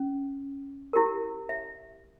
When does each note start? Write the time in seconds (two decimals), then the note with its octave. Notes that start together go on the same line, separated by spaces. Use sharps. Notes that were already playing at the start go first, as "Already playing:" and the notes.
Already playing: C#4
0.93 E4 G4 A#4
1.49 E5